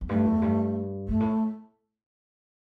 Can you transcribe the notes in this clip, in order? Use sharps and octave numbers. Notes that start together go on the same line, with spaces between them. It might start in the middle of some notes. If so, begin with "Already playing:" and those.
E2
G2 A3
E2
G2
G2 A3
A2